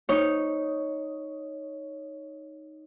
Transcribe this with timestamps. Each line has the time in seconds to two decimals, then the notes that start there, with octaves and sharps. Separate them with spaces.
0.09 D#4 C#5